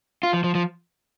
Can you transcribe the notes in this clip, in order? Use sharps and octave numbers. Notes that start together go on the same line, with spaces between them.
F4
F3
F3
F3